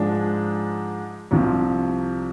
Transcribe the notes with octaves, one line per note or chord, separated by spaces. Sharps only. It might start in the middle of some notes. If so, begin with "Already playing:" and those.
Already playing: G#2 F3 G#3 D4
C2 C3 F3